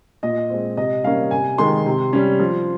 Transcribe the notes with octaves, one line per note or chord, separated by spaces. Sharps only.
A#2 D#5
G#3 C4
C3 D#5
G3 A#3 C#4 F5
C3 G#5
D#3 G#3 C6
C3
G3 C#4
F3